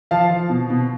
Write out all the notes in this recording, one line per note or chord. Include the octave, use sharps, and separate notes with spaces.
F3 F5 A5
F3
B2
B2